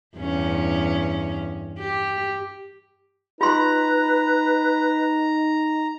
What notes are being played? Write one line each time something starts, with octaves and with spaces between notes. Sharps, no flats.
E2 G2 C#4
G4
D#4 F4 B4 A#5 C6